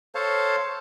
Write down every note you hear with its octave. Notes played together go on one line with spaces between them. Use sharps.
A4 C5 C#5 F5 A5